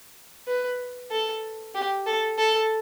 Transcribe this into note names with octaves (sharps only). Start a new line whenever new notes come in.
B4
A4
G4
A4
A4